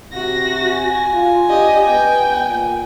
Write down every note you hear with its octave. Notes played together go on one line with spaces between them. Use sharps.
C3 F#4 A#6
G#5
F4
D4 G4 D#5
B3 G5
A#2